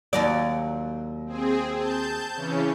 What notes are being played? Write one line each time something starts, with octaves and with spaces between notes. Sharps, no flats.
D#2 F#3 D5
C4 G#4
A5 G6
C#3 E3 C#4